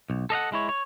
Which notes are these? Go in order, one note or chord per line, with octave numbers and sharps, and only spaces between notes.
B1
A4 D#5 F5 F#5
G#3 E4 C#5
C#5